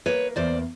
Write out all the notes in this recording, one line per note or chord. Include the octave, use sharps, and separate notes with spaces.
A#3 B4 C#5
E2 C5 D5